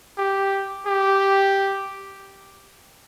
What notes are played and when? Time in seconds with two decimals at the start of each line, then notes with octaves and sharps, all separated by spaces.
0.18 G4
0.86 G4